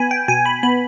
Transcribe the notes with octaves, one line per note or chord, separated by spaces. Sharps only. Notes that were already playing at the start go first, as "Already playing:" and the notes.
Already playing: B3 G#5 B5
G5
B2 G#5
B5
B3 B5